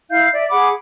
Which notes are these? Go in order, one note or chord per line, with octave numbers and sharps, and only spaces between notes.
E4 E5 F5 G6
D5 E5
G#4 F#5 B5 D6